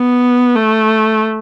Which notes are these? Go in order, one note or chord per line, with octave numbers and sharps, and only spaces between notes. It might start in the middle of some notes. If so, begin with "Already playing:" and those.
Already playing: B3
A3